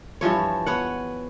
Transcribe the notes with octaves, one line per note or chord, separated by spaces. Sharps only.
G2 E3 F3 C#5
B3 C#5 F#5